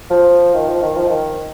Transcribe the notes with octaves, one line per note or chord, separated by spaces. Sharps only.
F3
D#3
F3
D#3
F3
D#3